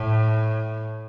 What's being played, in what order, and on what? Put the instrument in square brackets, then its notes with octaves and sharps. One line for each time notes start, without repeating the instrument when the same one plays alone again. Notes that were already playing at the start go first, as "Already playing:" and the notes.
Already playing: [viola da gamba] A2